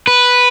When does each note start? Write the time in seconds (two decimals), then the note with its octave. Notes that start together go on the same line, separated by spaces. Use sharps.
0.07 B4